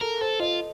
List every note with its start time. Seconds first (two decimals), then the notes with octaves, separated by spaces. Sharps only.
0.01 A4 A#4
0.21 A4 C5
0.40 F4 D#5